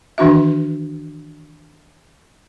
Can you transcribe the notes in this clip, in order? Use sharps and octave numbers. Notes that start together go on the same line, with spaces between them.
D#3 E3 D4 F#4 E5